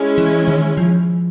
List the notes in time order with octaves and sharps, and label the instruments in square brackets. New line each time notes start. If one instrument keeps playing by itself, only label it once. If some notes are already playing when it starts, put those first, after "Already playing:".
Already playing: [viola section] G#3 C#4 E4
[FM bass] E3
D#3
F3